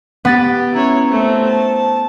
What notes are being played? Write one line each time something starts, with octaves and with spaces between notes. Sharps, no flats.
B3 G4 A6
C#4 E4 C#5 A#5
A3 C4 C5
A5